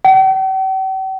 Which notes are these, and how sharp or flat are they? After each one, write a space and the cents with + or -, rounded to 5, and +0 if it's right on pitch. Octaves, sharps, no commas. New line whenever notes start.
G5 -45